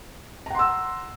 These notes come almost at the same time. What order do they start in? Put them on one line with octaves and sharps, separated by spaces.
A#5 F#5 C6 E6